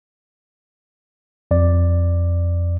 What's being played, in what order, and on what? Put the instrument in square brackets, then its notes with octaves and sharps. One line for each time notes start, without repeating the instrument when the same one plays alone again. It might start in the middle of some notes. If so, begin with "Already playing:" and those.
[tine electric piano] F2 D5